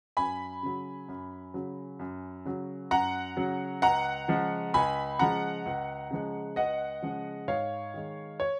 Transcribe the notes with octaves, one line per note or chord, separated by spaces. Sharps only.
F#2 G#5 B5
C#3 F#3
F#2
C#3 F#3
F#2
C#3 F#3
F#2 F#5 A#5
C#3 F#3
C#2 F#5 A#5
C#3 F3 G#3
C#2 G#5 B5
C#3 F3 G#3 F#5 A#5
C#2
C#3 F3 G#3
C#2 D#5 F#5
C#3 F3 G#3
G#2 C#5 F5
D#3 G#3
C#5